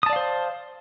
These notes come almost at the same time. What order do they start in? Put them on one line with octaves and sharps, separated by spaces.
D#6 A5 D5 F5 C5